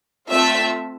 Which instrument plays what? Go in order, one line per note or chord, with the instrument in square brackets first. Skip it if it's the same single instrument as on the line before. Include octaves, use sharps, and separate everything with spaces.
[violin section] A3 C4 F4 E5